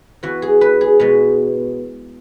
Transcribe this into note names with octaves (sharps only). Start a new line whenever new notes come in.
E3 B3 F#4
G#4
B4
G#4
B2 G#3 B3